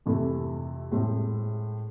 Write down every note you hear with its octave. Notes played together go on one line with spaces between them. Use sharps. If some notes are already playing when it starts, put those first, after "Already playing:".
F2 C3 E3 A3 E4
A2 G#3 C4